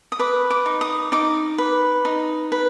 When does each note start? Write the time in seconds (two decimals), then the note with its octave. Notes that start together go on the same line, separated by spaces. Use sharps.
0.12 D#6
0.19 B4 D6
0.50 D6
0.66 D#4
0.81 D#6
1.12 D#4 D6
1.58 B4
2.05 D#4
2.52 B4